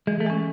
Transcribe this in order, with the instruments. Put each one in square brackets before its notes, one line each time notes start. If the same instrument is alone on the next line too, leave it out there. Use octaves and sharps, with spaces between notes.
[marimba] E3 [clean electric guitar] G#3
[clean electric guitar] A3
[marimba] G#3 C#4